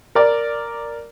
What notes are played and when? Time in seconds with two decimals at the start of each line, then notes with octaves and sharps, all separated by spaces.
0.15 A#4 D5